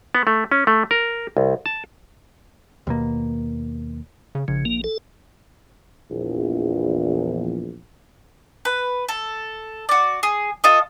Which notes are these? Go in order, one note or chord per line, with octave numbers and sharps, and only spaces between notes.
B3
A3
C#4
A3
A#4
C2
A5
D#2 B2 A#3
C#3
A#1 C#3
A#3
A4
A#1 E2
B4
A4
F#4 D5
G#4
F4 A4 D#5